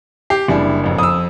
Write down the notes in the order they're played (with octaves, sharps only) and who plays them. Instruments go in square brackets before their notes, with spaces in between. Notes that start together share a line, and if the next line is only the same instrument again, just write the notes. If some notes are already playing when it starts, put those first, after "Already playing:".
[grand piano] G4 [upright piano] C7
[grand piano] F#1 [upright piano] G3 D4 E4
[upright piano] A1 F2
[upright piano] F2 [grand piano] D#6 E6